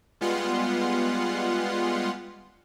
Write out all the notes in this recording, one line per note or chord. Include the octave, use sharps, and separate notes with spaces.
G3 G#3 B3 F4 F#5 C6